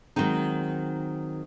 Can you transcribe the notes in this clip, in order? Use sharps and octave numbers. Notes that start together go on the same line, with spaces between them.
D#3 F#3 G#3 C4 D#4